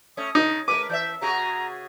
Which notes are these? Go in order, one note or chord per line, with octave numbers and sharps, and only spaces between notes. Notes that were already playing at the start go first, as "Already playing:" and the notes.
A3 C#4 D#6
C#3 D#4
G#3 A#4 B4 D6 D#7
E3 D5 E5 G6
C#3 F#4 G#4 A#5